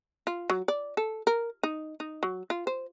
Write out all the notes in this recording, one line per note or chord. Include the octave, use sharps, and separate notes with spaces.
F4
F#3
D5
A4
A#4
D#4
D#4
F#3
F4
C5